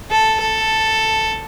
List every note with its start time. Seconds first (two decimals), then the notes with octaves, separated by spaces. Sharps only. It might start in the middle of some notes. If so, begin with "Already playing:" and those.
0.10 A4
0.41 A4